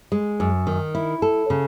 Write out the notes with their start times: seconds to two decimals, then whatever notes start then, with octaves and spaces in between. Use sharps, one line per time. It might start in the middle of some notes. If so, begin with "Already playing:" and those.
0.12 G#3
0.40 F#2
0.67 D#3
0.95 E4
1.22 A4
1.50 C#3